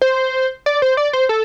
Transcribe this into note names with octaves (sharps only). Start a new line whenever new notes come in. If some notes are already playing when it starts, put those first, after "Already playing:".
C5
D5
C5
D5
C5
A4